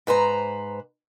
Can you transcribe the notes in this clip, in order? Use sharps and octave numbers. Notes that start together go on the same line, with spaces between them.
G#2 B4 C5 A#5